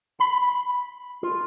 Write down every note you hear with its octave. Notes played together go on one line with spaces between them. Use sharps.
B5
F4